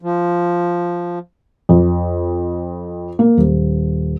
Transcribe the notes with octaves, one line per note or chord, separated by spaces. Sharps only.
F3
F2
A#3
D#1